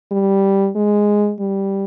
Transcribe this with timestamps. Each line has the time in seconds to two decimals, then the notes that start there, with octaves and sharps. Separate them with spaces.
0.12 G3
0.76 G#3
1.40 G3